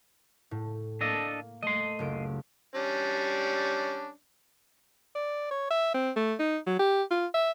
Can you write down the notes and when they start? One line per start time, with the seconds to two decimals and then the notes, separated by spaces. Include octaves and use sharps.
0.51 A2
1.01 A#3 D4 A4 D#5
1.63 A3 D#5 C6
1.99 F#1 C#2 D7
2.75 G3 C#4 D4
5.15 D5
5.51 C#5
5.71 E5
5.94 C4
6.16 A3
6.39 D#4
6.67 F#3
6.79 G4
7.11 F4
7.34 E5